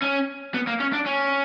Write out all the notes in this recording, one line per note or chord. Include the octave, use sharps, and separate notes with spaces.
C#4
B3
A#3
C#4
D4
C#4